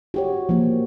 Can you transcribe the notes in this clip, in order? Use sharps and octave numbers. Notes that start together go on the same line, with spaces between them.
F#4 G4 C#5
F3 A#3